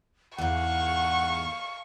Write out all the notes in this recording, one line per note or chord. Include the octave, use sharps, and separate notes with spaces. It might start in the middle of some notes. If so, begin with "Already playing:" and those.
E2 G#2 F5 F#5 C#6